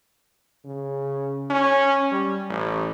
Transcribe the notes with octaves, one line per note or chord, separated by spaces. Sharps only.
C#3
C#4
G3
A1